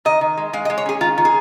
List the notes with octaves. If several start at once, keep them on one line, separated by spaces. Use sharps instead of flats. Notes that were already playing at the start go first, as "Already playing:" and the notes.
D#3 D#5
D#3
G#3
G#3 F5
D#5
G#3
C#5
C#4 G#4
D#3 F4
D#3
G#4